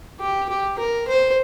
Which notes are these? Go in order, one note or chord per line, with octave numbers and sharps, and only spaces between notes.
G4
G4
A#4
C5